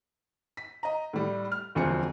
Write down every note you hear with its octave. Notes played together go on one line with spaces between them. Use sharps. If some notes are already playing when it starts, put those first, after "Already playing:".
B6
D#5 A#5
A2 G3
F6
E1 D2 F3 C4 C#7